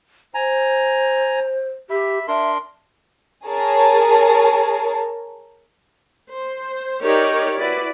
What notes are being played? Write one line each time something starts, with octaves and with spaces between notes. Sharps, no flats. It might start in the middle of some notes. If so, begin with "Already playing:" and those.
C5 G#5 A#5
G4 E5 B5
D4 A#4 E5 C6
G#4 A#4 C#5 A5
C5
D#4 G4 A#4 C#5 D5
E4 F#4 B4 D5